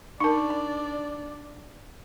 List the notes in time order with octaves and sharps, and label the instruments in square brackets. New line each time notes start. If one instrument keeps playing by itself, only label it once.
[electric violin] D4 D5 [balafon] D#4 A#4 [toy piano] A5 B5 C#6
[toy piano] B5